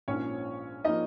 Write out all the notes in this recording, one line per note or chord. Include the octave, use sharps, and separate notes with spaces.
A#1 G#2 F3 A#3 C#4 C#5
F3 A#3 D#4 D#5